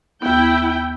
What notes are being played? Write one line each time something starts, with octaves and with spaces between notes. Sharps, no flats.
D#2 B3 E4 G5